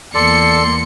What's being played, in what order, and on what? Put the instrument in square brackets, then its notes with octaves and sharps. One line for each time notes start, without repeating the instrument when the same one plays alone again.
[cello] E2 A#3 [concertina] A4 D5 [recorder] C6 [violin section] C#7